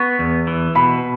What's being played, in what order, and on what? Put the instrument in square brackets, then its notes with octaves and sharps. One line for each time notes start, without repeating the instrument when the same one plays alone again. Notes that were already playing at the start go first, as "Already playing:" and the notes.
Already playing: [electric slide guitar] B3 [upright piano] C#6
[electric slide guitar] E2
E3
[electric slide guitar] B2 [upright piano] B5